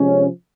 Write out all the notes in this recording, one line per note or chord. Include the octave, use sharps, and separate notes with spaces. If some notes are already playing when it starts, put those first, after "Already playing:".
Already playing: C3 F3 G#3 C#4